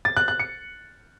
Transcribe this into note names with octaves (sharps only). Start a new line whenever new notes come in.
A6
F#6
F#6
C#7